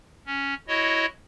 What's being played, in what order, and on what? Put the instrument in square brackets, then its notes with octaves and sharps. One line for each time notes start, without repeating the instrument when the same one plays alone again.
[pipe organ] C#4
E4 F#4 C#5 D#5